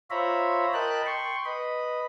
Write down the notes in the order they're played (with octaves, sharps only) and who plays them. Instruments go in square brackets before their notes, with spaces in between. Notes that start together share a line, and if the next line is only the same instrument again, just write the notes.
[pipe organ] F4 C5 C#5 E5 A#5 B5
A#4 D#5 G5 A5 B5 F#6
G5 C6 C#6
B4 D#5 B5